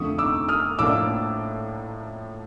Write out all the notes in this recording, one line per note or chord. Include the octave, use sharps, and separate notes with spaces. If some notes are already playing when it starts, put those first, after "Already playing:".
Already playing: F2 D3 F3 A3 C4 C#6 D#6
D6 E6
D#6 F6
A2 F3 A#3 D4 D6 E6